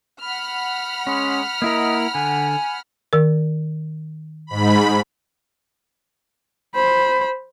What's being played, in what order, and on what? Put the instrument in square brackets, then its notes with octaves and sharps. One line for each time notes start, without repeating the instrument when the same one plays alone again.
[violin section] F#5 B5 F6
[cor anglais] G#3 [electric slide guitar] C#4
[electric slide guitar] A#3 E4 A#4 [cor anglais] D#5
[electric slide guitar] D3 [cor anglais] G#5
[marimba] D#3 A#4
[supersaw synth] G#2 B5
[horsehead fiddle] C5 B5